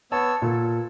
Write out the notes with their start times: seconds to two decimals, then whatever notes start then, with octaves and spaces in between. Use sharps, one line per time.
0.12 B3 C#5 A5 E6
0.42 A#2 A4